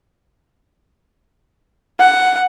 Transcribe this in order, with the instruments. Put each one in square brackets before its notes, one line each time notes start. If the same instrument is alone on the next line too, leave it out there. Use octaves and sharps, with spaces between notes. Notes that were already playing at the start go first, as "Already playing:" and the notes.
[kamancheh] F#5